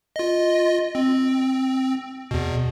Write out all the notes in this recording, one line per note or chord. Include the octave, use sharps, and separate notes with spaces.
F4 D#5
C4
E2 B2